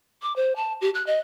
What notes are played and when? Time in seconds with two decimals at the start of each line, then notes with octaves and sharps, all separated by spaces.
0.22 D6
0.36 C5
0.56 A5
0.81 G4
0.94 F#6
1.07 D#5